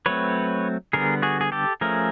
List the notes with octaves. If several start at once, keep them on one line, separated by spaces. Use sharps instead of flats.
F#3 A3 C4 B4 C#5
D3 G3 B3 G#4 A#4
F#4 G#4
G#4
G4 A4
F3 A3 C#4 G#4 A#4